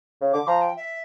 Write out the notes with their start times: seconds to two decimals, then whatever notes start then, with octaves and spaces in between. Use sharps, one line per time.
0.21 C#3
0.33 D3 D6
0.47 F3 A#5
0.61 G5
0.76 E5